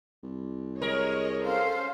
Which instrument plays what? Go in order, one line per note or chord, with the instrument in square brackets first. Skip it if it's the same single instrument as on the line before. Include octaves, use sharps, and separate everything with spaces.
[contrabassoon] C2
[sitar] G#3 A#4 [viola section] C#5 D#5
[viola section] C#4 A4 C5 [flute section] F5